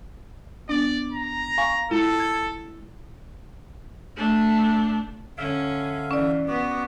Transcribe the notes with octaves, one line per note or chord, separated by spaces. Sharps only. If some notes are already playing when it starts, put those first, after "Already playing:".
B3 D4 D5
A#5
F5 G#5 C#6
G#3 E4 F4 A4
G#6
A3 D4
D3 C#4 E5 F5
E3 C#4 D5
B3 F#4 D6